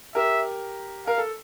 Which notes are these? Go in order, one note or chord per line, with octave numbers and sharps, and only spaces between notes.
G4 A#4 E5
A#4 F5
A4